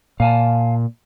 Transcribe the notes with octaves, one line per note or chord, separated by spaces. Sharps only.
A#2 F5 G#5 A5